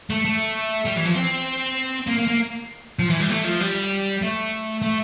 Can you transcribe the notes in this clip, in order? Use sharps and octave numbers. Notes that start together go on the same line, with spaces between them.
A3
A3
G3
E3
F3
C4
A#3
A#3
A#3
F3
E3
G3
A3
F3
G3
A3
A3